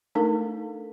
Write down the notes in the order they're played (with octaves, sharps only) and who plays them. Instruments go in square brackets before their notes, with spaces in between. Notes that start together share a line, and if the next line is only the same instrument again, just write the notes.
[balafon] A3 D4 D#4 A4 A#4